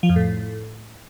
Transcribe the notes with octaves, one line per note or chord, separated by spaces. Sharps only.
F3
F2
A2